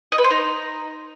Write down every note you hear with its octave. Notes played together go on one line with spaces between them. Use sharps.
D#5
B4
C5
D#4